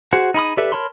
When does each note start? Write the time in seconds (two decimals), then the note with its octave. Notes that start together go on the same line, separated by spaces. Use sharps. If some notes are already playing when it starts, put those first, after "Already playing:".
0.13 F#4 G#4 C5 F#5
0.34 D#4 G#4 B5 D#6
0.57 G4 A4 B4 D5 E5
0.72 A#4 C#5 A5 B5 C6